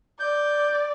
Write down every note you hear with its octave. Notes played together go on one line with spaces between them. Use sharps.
D5 G6